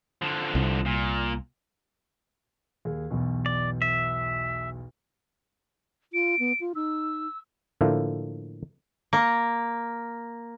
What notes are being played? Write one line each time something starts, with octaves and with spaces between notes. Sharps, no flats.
D3 F3
C2
A#2
D#2 G#4
B1 E2 B2
D5
E5
F4 D7
B3
F4
D#4 E6
A2 D3 F3 A3 A#3
A#3